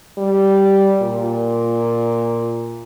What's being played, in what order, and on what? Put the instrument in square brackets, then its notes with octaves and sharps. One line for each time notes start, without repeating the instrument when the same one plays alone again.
[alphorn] G3
A#2